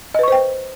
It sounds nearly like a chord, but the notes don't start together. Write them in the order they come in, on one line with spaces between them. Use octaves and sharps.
D#5 B4 C#6 C5 G5